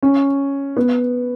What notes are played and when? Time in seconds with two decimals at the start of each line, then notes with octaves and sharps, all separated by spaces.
0.03 C#4
0.77 B3